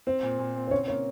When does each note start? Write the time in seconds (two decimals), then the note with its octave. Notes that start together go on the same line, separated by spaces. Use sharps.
0.07 C4 C5
0.23 A#2
0.39 A#2
0.56 C4
0.67 C5
0.71 C#3 C#5
0.88 A#3 C#5